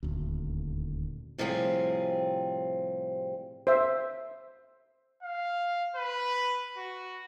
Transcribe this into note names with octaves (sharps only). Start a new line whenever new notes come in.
D#1 D2
A2 C3 F3 G3 C4 G#4
C5 E5
F5
B4
F#4